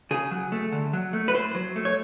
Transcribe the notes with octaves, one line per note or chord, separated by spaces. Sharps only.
C#3 G#4
F#3
A3
D3
F#3
A3
B4
A2 C5
F#3
A3
C#5